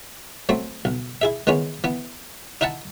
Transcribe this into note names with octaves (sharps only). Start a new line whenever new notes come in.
F#3 A3 C4
B1
E4 G#4 E5
D#3 E3 G#3 B3 C#4
E3 B3
D#4 E4 E5 F#5 A5